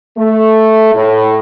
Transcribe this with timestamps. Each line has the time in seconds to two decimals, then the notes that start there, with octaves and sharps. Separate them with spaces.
0.17 A3
0.94 A2